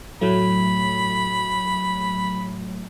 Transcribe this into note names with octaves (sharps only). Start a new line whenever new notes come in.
A2 F#3 A3 B5